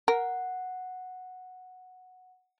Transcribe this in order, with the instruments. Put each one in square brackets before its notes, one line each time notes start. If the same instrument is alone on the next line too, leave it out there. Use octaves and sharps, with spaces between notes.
[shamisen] A#4 [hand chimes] F#5